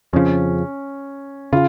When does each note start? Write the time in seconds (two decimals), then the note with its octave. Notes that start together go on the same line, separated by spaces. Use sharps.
0.13 F2 C#3 F3 C#4
1.53 C#3 F4